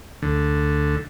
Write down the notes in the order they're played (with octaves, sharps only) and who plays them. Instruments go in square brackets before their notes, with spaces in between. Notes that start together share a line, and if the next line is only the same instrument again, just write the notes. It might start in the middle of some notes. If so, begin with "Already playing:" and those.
[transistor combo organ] D2 D3